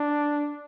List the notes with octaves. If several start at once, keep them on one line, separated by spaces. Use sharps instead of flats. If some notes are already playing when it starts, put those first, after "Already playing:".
Already playing: D4